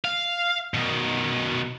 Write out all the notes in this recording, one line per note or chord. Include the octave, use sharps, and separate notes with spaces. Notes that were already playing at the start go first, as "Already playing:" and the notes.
F5
B2 D#3